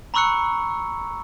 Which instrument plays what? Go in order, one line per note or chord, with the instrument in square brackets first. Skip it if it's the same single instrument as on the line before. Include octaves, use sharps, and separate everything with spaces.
[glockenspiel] A#5 B5 C#6 E6 F#6 C#7